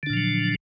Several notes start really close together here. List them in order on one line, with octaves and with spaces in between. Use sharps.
D3 D4 A#2 F3 F#3